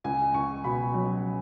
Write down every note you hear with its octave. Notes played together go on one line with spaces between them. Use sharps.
C#2 G#5
C#2 C#6
B2 B5
F#3